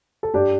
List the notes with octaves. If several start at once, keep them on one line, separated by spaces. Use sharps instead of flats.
A4
G2 D4 G4